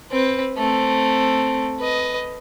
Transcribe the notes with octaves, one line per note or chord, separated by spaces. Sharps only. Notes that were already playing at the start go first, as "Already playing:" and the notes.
C4 B4
A3 C4
B4 D#5